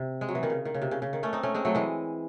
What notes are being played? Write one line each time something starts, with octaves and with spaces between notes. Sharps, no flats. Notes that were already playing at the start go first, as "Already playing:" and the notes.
Already playing: C3
G#3
F#3
E3
D#3
C#3
D#3
C#3
C3
C#3
C#3
D#3
A3 C#4
C4 D#4
A3 C#4
G#3 C4
F#3 A3
E3 G#3